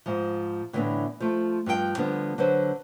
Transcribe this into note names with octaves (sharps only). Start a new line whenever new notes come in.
G#2 F3
A2 D3 E3 A3 B3 D4
F3 A3
G2 F3 G#4 G5
D3 F3 G3 B3
D3 F#3 B4 C5